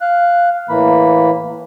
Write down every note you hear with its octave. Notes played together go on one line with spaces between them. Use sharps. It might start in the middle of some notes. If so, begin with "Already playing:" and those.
F5 F#6
A2 E3 A#3 B5